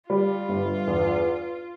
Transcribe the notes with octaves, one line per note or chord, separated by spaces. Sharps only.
G3 F4
G1
E2